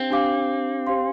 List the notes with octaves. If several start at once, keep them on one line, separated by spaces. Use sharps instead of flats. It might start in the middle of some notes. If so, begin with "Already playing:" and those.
Already playing: C4 D4 G4 F5
D4 G4 F5 D6
G4 C5 F5 C6